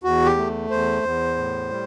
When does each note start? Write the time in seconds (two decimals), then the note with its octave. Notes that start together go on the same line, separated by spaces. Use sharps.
0.04 E2 F#4
0.25 G4
0.37 A3
0.70 E2 C5
1.03 E2
1.36 A2
1.70 G3